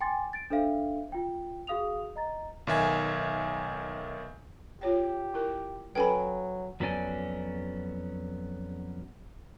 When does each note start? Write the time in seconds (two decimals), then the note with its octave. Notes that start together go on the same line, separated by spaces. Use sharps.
0.01 G5 G#5 C6 D6 A6
0.33 A6 D7
0.50 D4 A4 C5 E5 F5
1.12 F4 G5
1.67 F#4 G#4 F5 D#6 F7
2.16 D#5 A#5 A6
2.67 B1 D#3 E5 G#5
4.81 F4 G4 C#5 G5
5.34 E4 A#4
5.95 F#3 C#4 A4 B4 G5 G#5 B5
6.80 F2 F#3 B3 C#4 D5 G#5